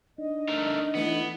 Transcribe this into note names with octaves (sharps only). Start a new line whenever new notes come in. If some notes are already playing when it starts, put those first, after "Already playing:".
D4 D#4 D#5
A3 A#4
E3 A3 B3 E4